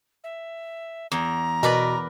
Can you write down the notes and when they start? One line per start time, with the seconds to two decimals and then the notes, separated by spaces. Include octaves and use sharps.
0.24 E5
1.12 E2 A#5
1.63 B2 A#4 B4 D5